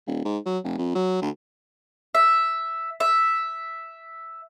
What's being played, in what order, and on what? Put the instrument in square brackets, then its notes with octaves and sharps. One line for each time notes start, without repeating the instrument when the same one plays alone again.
[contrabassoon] D#1
G#2
F#3
F1
F2
F#3
D2
[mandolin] E5
E5